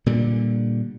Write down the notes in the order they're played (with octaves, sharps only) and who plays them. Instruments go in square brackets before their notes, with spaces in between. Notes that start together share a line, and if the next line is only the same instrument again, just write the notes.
[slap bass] A#2 D3 G3